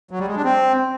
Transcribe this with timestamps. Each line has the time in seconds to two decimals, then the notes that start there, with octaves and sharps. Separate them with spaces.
0.11 F#3
0.19 G3
0.28 G#3
0.36 D4
0.44 C4